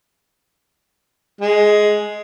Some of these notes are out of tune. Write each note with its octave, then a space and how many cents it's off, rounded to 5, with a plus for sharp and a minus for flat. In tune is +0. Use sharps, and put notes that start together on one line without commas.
G#3 +10